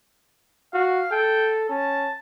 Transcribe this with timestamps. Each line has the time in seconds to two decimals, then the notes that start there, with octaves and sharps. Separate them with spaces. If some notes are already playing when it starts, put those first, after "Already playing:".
0.73 F#4 F5
1.11 A4 G5
1.69 C#4 A5